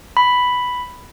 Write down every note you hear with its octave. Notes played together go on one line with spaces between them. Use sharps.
B5